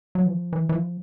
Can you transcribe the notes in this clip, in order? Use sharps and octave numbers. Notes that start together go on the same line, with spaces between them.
F#3
E3
F3
E3
E3
F3